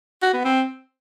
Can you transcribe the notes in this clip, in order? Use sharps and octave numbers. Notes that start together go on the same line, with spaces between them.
F#4
B3
C4